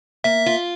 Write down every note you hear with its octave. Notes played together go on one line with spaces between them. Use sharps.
A#3 E5
F4